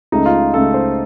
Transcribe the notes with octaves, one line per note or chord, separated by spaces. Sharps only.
C#2 C#3 A3 D#4
F4
C#2 C#3 A3 A4
C5